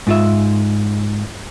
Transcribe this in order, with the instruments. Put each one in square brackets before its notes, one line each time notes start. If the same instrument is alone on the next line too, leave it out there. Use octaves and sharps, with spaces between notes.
[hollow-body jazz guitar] G#2 F4 E5